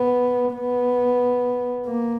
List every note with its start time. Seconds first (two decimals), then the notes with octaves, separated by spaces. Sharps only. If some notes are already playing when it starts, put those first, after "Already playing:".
Already playing: B3
0.54 B3
1.86 A#3